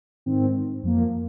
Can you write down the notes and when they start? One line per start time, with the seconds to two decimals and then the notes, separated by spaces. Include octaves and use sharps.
0.26 G#2 D#3 C4
0.83 F2 F3 A#3